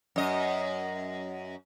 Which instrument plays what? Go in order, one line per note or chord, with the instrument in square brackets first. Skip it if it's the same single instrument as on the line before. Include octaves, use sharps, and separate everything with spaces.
[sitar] F#2 D#5